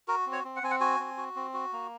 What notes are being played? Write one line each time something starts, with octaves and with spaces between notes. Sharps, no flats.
F#4 A#4
C4
C#5
C4
F#5
C4 G#5
F#5
F#4 G#5
C4
F#4
C4
F#4
A#3